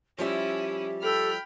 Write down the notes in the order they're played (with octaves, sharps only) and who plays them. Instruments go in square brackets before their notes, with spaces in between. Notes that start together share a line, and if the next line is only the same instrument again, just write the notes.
[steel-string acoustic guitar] F3 G3 E5 [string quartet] C#4 E4 [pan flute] G4
[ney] A4 [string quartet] G5 B5 F6